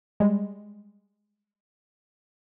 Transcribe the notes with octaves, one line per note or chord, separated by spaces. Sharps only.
G3 G#3